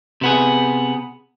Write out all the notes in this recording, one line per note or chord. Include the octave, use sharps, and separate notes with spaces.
C3 B3 G#4